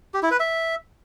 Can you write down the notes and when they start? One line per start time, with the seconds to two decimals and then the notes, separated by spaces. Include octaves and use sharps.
0.14 G4
0.23 E4
0.31 B4
0.40 E5